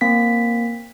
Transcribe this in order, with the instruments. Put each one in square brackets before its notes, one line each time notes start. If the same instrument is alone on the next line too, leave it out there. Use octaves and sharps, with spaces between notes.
[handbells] A#3 C4 B6